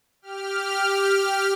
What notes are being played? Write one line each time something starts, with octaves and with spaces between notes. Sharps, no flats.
G4 F6